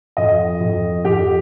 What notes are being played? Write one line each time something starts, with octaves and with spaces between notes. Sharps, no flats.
F2 D#5
F2
F2 G4